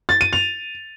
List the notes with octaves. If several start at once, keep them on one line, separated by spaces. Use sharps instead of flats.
A6
D#7
F7